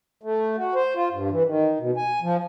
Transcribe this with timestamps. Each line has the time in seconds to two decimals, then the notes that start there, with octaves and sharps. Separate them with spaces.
0.23 A3
0.58 F#4
0.75 C5
0.96 F4
1.12 G2
1.30 E3
1.46 D#3
1.80 B2
1.97 G#5
2.22 F3